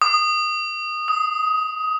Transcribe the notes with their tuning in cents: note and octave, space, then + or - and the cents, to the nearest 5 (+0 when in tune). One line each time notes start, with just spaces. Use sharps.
D#6 -20
D#6 +20